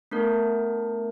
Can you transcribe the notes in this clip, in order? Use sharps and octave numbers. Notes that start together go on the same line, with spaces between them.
A3 B3 D4 A#4